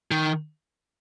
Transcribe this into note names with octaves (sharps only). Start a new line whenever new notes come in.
D#3